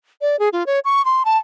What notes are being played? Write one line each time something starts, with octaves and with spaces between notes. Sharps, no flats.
D5
G#4
F4
C#5
C#6
C6
A5